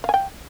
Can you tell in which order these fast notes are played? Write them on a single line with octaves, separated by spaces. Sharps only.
F5 G#5 G5